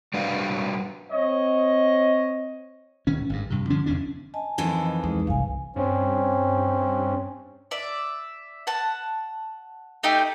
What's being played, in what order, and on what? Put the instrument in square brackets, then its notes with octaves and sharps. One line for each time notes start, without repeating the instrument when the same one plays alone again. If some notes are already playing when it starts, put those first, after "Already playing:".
[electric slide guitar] G3 D4 F#4 B4 F5 F#5
[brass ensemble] C4 C#5 D#5
[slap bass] D1 D#3 C#4
G#1 G2
G2 C3
D3 F3 C#4 D4
F1 E2 C#4 D4
[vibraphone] D#5 G#5 A5
[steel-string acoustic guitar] F2 D#3 E3
[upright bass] E2 [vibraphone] G#3 D#4
[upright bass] G1 C2 [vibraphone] F5 G#5
[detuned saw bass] G2 [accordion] C4 C#4
[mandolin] D5 E5
F#5 A5
A3 D#4 G4 G6